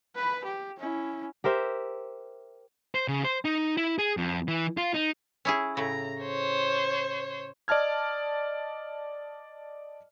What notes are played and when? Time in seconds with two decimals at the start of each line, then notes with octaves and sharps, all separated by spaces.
0.15 B4 B5
0.44 G4
0.78 C#4 E4
1.44 G4 A#4 C5 E5
2.95 C5
3.08 C#3
3.24 C5
3.45 D#4
3.77 E4
3.98 G#4
4.17 F2
4.48 E3
4.77 F4
4.94 D#4
5.45 C#4 E4 G#4
5.77 A2 C#3 A#5
6.21 C5 C#5
7.68 D5 D#5 A5 F6 G#6